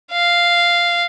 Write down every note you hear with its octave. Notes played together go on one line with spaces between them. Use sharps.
F5